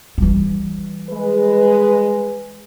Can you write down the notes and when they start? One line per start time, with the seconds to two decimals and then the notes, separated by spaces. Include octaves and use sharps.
0.18 E3 G3
1.10 G#3 B4